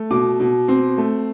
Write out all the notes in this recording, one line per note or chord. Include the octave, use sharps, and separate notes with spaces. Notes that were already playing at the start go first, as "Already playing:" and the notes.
Already playing: A3
B2 D6
B2
C4
A3